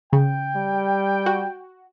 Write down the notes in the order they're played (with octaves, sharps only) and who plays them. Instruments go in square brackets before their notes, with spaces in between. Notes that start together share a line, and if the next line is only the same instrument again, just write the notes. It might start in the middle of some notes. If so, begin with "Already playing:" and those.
[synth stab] C#3 [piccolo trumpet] G5
[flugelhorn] G3
[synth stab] F#4